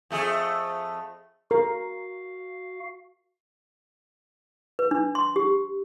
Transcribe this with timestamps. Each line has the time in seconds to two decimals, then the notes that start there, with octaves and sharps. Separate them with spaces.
0.11 F2 A3 G#4
1.51 F#4 A#4 F5
4.79 B4
4.91 D4
5.15 C6
5.36 G4